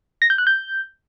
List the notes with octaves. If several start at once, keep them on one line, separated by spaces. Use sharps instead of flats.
A#6
G6
F#6
G6